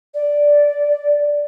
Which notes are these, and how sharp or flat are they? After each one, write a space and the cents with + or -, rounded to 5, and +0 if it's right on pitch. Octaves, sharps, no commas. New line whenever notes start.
D5 -5